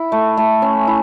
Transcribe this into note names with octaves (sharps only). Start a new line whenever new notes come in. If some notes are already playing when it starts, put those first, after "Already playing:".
Already playing: E4
A3
A3
C#4
E4